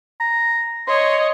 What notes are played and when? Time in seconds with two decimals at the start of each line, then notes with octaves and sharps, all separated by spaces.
0.20 A#5
0.88 C#5 D#5 C6